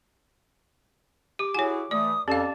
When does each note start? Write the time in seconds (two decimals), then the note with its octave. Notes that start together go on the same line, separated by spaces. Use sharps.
1.39 G4 D6
1.54 E4 F#4 G#4 C#5 G#5
1.91 E3 A3 D5 D#6
2.28 F2 C#4 G4 A4 D5 F5 A5